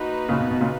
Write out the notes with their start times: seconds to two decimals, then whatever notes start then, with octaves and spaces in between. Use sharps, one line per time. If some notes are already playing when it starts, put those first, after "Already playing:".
Already playing: A#3 D#4 F#4 B4
0.29 A#2 C#3
0.41 B2
0.51 B2
0.61 A#2 C#3